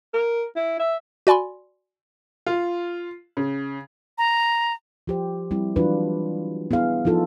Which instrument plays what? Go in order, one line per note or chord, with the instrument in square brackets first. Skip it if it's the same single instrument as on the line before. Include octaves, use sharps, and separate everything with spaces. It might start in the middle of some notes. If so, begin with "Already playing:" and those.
[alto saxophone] A#4
E4
E5
[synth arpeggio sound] F#4 D5 G#5 B5 C6
[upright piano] F4
C#3
[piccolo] A#5
[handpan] F3 G4 C5
G3 C4 E4
E3 F#3 D4 F4 F#4 B4
B3 E4 G#4 F5
F3 D#4 F4 A4